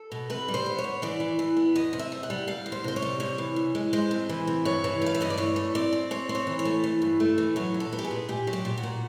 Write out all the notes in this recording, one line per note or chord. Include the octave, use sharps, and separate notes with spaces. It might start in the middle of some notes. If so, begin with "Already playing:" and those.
Already playing: A4
B2
C3 B4
G3
C5
B3
C#5
B3
E3 D5
E3
E3
B3
E2 D#5
C3
E5
G3
F#5
G3
G3 F5
E2
C5
C3 C5
C#5
G3
C3 C#5
E3
E3
G#3
G#3 C5
C3
E3
C3
G2 C#5
E3
A3 F5
E5
G2 D#5
D5
E3 C#5
A3
C4 D5
C4
C4 C#5
C4
C#5
E3
C#5
A3
E3
G2
A3
E3
F#3 C#5
A#2
A4
B3
G4
G#4
A#2
A#2 G4
F#3
G4
A#2
F#4
A#2